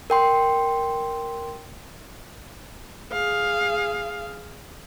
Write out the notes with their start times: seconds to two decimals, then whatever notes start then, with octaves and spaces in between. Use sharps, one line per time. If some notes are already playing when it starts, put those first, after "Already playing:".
0.10 A#4 G5 C6
3.12 G#4 F5